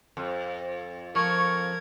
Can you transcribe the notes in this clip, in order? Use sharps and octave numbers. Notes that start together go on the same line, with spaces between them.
F2
F3 A#4 C#6 G#6